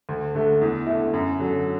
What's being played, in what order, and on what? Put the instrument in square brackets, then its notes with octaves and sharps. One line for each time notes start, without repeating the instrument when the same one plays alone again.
[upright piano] D2
D3 A3
E2
D3 A3 E4
F#2
D3 F#3